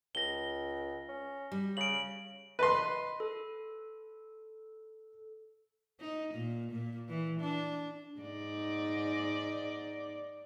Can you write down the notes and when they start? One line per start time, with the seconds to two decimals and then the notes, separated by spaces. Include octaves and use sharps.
0.15 C#2 A#6 G7
1.09 C#4
1.52 G3
1.77 C#3 D7 F#7
2.59 B4 D#5 C6
3.20 A4
6.01 D#4
6.34 A#2
6.71 A#2
7.09 E3
7.40 D4
8.20 G#2 D#4 D5